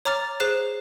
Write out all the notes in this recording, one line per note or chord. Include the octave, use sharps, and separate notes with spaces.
C#5 A#5 D6 F6 A6
G#4 C5 F#6 C7 E7